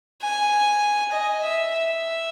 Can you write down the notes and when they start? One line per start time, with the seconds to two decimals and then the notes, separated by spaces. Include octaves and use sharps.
0.22 G#5
1.12 D#5
1.42 E5
1.72 E5